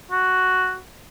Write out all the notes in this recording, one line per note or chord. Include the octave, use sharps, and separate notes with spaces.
F#4